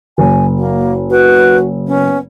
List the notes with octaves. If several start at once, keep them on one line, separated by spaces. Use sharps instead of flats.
F#1 G#5
A#3 F#4
F#4 B4
B3 C#4